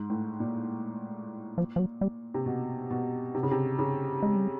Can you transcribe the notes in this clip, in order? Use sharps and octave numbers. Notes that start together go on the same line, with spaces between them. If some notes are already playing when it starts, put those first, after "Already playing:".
Already playing: G#2
A2
A#2
F3
F3
F#3
G3
C3
B2
B2
C3
C#3
C3
C#3
G#3
G3